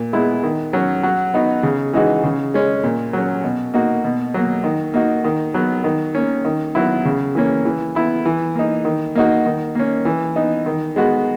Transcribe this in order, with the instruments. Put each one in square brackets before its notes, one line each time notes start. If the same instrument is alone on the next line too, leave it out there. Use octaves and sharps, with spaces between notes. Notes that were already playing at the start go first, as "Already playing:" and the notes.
Already playing: [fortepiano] A#2
G#3 B3 E4
D#3
F#3 C#4
F#3
B3 D#4 F#4
C#3
E3 G#3 D#4 F#4
C#3
G#3 C#4
A#2
F#3 C#4
B2
A#3 D#4 F#4
B2
F#3 A#3
D#3
A#3 D#4 F#4
D#3
F#3 B3
D#3
A#3 C#4
D#3
F#3 B3 E4
C#3
E3 A#3 C#4
E3
B3 E4
E3
A#3 D#4
D#3
A#3 D#4 F#4
D#3
A#3 C#4
E3
B3 D#4
D#3
G#3 B3 F#4